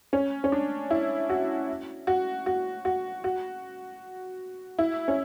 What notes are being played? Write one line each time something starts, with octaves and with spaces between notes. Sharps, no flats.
C#4
C#4
D4
E4
F#4
F#4
F#4
F#4
F#4
E4
C#4